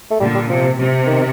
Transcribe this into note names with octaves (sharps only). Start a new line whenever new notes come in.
A3
A#2 D3 G3
G3
C3 F3
C3
D#3